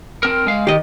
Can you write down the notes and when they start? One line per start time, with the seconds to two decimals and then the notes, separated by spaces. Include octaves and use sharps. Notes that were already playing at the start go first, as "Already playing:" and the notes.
0.23 C4 A#4
0.47 G#3 F5
0.67 D#3 G4 D#5